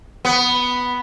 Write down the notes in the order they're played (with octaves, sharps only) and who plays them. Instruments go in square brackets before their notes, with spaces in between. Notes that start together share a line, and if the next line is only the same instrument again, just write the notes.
[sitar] B3